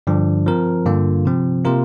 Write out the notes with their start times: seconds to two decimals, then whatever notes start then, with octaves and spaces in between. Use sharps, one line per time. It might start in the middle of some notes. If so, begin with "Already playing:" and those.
0.07 G2 D3 F3 D4
0.46 F3 C4 A#4
0.86 G2 D3 A#3 F4
1.25 C3 F3 C4
1.65 C3 A#3 F4 A#4